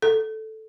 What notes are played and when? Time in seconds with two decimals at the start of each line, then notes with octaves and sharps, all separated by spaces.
0.02 A4